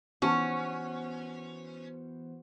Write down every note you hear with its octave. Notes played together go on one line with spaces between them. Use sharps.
E3 B3 C#4 F#4 C5